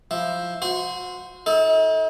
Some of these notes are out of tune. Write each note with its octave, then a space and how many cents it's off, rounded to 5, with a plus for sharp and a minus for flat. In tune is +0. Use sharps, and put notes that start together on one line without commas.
F3 +0 E4 +0
F#4 -35 C5 -15
D#4 +45 A4 +0